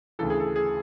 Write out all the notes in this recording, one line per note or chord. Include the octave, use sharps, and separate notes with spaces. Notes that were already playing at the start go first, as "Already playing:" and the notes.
D2 C#3 E3 A4
G#4
A4
G#4